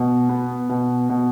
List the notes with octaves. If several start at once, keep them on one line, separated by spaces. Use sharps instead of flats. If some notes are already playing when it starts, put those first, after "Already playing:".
Already playing: B2
B3
B2
B2